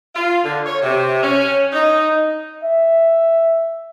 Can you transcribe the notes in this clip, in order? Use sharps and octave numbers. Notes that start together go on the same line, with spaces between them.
F4
D3
C#5
C3
C#4
D#4
E5